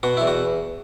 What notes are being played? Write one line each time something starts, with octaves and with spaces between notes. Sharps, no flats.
B2 F#4
E2 E4
F#4